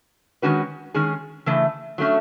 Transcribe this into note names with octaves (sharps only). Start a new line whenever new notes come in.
D#3 G#3 C#4 F#4 B4
D#3 G#3 C#4 G#4
C#3 E3 A3
F#3 A3 C#4